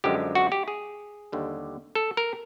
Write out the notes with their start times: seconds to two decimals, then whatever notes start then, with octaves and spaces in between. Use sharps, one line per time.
0.04 F#2 D3 F3 G#3 G4
0.35 F#4
0.52 G4
0.68 G#4
1.32 D#2 D3 G3
1.95 A4
2.17 A#4